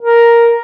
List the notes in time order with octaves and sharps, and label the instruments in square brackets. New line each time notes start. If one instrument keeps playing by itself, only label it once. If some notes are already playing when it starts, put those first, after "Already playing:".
[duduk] A#4